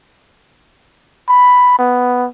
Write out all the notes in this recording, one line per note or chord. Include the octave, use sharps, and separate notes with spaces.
B5
B3